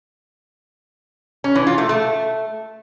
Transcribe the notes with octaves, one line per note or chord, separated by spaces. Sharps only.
C#4
E3
F4
A3
A3